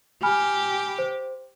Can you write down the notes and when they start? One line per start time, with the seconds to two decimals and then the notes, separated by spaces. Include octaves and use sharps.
0.23 G4 G#5 B5 F6
0.98 C5